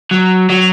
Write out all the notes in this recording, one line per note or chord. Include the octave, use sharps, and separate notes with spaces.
F#3
F#3